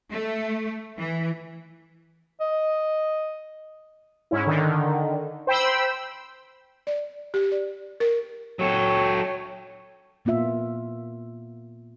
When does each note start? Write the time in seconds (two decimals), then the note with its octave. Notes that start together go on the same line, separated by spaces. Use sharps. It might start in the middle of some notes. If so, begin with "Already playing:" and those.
0.12 A3
0.97 E3
2.41 D#5
4.31 G#2 C#4 E4
4.46 D3 D#3
5.47 C5 G5 B5 E6
6.87 D5
7.34 G4
7.52 D5
8.00 A#4
8.59 F#3 A4 C#5 G5
10.25 A#2 A#3 B3 F4 E5